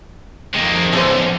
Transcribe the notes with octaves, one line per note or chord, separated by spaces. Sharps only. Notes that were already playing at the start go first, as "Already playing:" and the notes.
F2 C3 D#3 G#3 A#3
B1 A2 D3 F3 C#4 C5